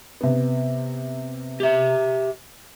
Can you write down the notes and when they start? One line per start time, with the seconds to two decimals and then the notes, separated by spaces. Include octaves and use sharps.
0.21 C3 B3
1.60 G4 E5